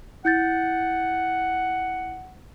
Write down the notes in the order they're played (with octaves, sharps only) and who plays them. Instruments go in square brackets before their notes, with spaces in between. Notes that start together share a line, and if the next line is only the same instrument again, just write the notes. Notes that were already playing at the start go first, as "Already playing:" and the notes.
[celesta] E4 G6 A6 [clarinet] F#5